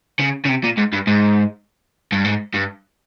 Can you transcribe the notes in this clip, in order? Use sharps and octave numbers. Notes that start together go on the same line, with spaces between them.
C#3
C#3
C3
A#2
G#2
G2
G#2
G2
G#2
G2